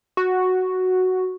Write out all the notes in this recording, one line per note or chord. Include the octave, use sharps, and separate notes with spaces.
F#4